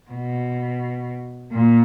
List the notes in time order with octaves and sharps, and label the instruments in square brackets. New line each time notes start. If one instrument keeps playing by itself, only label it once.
[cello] B2
A#2